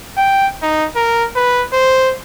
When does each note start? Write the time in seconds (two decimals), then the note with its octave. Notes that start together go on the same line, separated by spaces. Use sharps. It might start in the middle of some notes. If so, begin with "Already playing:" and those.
0.17 G5
0.62 D#4
0.96 A#4
1.36 B4
1.73 C5